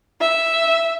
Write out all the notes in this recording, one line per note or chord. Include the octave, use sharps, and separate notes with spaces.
E5